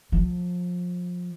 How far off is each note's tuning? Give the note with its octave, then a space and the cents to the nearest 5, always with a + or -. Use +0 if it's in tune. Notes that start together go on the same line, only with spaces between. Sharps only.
F3 +30